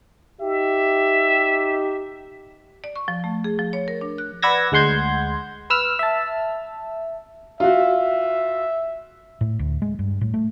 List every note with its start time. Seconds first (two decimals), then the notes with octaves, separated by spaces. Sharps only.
0.41 D#4 G4 E5
2.84 D5
2.96 C#6
3.08 F3
3.24 A3
3.44 G#4
3.59 F3
3.73 C#5
3.88 A#4
4.01 D4
4.18 F#6
4.42 B4 D5 F#5 E6 G#6 A#6
4.72 D2 G#3 F#5 C6 G6 G#6
5.70 B4 E6 F6
5.99 E5 A5
7.60 F4 F#4 E5
9.41 A2
9.59 D2
9.82 G#3
9.99 G2
10.21 A2
10.34 A3